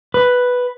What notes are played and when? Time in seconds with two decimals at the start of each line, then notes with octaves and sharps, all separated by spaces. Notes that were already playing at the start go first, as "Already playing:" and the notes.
0.14 B4